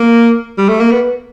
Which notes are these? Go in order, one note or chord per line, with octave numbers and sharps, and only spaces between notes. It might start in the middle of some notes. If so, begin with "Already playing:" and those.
Already playing: A#3
G3
A3
A#3
B3